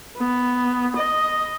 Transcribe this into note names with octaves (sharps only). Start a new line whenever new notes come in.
B3
D#5